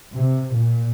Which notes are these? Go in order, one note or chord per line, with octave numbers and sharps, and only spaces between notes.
C3
A#2